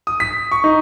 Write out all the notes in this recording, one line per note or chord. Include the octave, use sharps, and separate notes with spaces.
D#6
B6
C#6
D#4